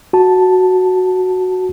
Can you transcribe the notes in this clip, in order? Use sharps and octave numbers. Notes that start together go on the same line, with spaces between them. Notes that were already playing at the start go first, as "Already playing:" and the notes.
F#4 A5